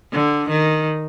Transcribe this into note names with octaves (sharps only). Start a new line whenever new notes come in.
D3
D#3